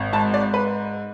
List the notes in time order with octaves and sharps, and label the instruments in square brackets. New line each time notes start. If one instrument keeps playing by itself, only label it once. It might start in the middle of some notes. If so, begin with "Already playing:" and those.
Already playing: [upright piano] G#1
G#2 A5
D5
B4